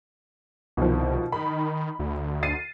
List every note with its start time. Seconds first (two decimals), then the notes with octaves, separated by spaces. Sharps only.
0.77 C2 B2 D#3 F3
1.32 D#3 B5
1.99 D2
2.43 A6 C7 D#7